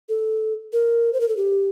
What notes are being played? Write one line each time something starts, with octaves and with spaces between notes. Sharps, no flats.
A4
A#4
C5
A#4
A4
G4